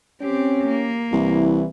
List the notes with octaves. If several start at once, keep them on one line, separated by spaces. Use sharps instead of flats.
C4 C#4 G4
A#3
C2 E3